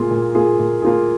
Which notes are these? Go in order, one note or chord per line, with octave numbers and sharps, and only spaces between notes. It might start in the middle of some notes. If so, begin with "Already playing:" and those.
Already playing: A#2 A#3 F4 G#4
A#2
A#3 F4 G#4
A#2
A#3 F4 G#4